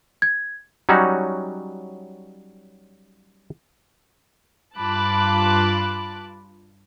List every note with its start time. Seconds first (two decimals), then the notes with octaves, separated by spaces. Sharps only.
0.22 G#6
0.89 F#3 G3 C#4 D#4 F#4
4.79 G2 F4 A5 B5 D6 F#6